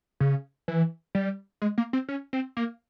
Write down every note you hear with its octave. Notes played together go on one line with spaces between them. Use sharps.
C#3
E3
G3
G#3
A#3
C4
C#4
C4
A#3